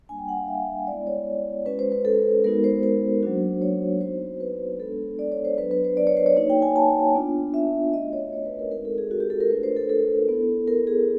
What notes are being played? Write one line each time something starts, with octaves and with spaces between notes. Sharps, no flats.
G3 A#3 D4 G#5
G5
F#5
F5
E5
G#3 B3 E4 D5
C#5
G#3 C#4 F#4 B4
C5
B4
A4
G#3 B3 D#4 F#4 A#4
C5
C5
F#3 A#3 D4 F#4
C#5
B3 D#4 F#4 C5
B4
G#3 B3 D4 A4
D5
C#5
C5
F#3 B3 D4 B4
B4
C5
D5
C#5
C5
C#5
A#3 D#4 F#4 C#5
G5
G#5
A5
B3 D4 F4
E5
A3 C#4 F#4 D#5
C#5
C#5
B4
A#4
G#3 C4 D#4 F#4 A#4
A4
G#4
F#4
G4
A4
A#4
A3 D4 F4 B4
C5
A4
A4
B3 E4
A#4
G#4